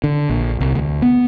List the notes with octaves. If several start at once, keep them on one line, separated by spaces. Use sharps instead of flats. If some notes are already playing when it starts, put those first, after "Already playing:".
D3
A#1
C2
D2
B3